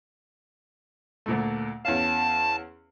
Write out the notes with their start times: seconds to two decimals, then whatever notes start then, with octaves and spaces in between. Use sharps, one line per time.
1.26 D2 A#2 A3
1.85 E2 C#4 F5 A5